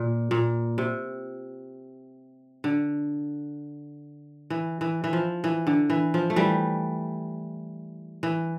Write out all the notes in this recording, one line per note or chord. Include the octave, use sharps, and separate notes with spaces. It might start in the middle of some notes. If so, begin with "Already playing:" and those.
Already playing: A#2
A#2
C3
D3
E3
E3
E3
F3
E3
D3
E3
F3
A3
E3 G3
E3